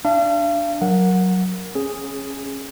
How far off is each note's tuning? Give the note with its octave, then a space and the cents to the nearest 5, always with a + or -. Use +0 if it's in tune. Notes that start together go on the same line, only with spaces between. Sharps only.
D4 +0 F5 -40
F#3 +0 A#4 +0 F#5 -15
C#4 -20 G#4 +0